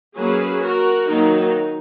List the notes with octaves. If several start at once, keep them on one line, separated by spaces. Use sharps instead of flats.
F#3 A#3 C#4 G#4 B4
F#4 A#4
D#3 F#3 A#3 D#4